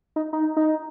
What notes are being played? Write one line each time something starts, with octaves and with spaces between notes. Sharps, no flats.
D#4
D#4
D#4